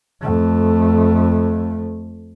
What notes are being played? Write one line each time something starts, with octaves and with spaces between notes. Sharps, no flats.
F2 A3